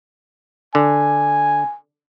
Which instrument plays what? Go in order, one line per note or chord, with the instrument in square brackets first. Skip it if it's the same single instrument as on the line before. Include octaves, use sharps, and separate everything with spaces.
[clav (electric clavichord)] D3 [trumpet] G#5